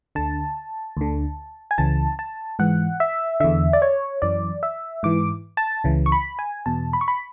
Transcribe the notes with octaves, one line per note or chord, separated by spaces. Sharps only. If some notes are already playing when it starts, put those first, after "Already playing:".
D2 D3 A5
D2 D3
G#5
C#2 C#3 E3 A5
A5
G#2 E3 F#5
E5
E2 D3 E5
D5
C#5
F#2 E3 D5
E5
G#2 E3 D6
A5
C#2 C#3 E3
C#6
B5
G#5
E2 B2 A5
B5
C#6
B5